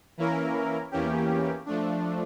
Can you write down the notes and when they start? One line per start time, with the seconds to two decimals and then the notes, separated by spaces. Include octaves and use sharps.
0.17 E3 A#3 C#4 E4 A#4
0.91 E2 E3 A#3 C#4 G4
1.66 F3 A3 D4